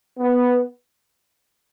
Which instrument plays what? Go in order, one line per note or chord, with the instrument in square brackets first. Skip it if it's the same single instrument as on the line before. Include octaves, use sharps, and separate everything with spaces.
[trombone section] B3